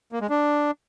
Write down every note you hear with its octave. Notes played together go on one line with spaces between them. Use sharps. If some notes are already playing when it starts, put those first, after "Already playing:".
A#3
G#3
D4